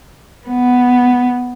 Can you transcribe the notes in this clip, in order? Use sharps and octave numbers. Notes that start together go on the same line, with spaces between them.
B3